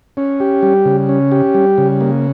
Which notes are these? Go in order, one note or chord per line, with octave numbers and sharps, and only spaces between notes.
C#4
G4
G3
C#3
C#4
G4
G3
C#3
A#3